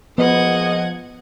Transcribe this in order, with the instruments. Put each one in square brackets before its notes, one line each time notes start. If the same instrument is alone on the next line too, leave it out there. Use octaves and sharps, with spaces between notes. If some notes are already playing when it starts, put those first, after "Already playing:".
[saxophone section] A#2 G#3 D#5 [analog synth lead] F3 [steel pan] B3 [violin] F#5 G#6